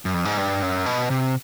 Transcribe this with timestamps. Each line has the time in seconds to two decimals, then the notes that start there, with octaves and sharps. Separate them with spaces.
0.05 F#2
0.14 F2
0.25 G#2
0.37 G2
0.62 F#2
0.86 B2
1.10 C3